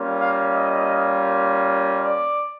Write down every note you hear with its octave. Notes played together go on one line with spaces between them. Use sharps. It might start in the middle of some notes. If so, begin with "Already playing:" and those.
Already playing: G3 A#3 C#4 F4
F5
D#5
D5